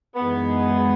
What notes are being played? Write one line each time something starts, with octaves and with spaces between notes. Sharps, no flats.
F#2 E3 G#3 B3 D#4 G#4